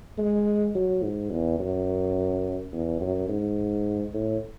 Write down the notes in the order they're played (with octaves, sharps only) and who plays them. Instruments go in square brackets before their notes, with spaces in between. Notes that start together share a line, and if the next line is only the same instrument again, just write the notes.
[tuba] G#3
F#3
G#2
E2
F#2
E2
F#2
G#2
A2